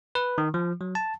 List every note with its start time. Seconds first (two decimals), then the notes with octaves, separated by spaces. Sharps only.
0.15 B4
0.38 D#3
0.54 F3
0.81 F#3
0.95 A5